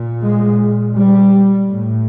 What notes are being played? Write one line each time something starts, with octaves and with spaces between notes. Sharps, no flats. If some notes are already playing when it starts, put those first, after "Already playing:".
Already playing: A#2
G#3
G3
A2